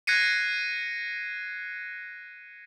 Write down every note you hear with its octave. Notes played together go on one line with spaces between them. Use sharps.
F#6 G#6 A#6 C7 C#7 D#7